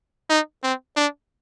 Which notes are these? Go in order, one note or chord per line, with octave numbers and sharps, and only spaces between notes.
D#4
C4
D4